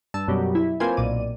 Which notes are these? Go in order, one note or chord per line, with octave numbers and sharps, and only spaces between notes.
G2 A5 E6
F#2 B2 F#3 G3
E4
A#3 C4 F4 B4 C5 G#5
B1 A#2 D5 D#7